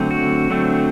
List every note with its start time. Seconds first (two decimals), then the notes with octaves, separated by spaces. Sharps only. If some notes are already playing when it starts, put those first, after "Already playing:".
Already playing: D3 F#3 A3 C4
0.11 F#4
0.50 D3 F#3 A3 C4